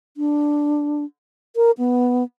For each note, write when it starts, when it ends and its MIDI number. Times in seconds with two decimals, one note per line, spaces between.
0.17 1.04 62
1.56 1.71 70
1.78 2.23 59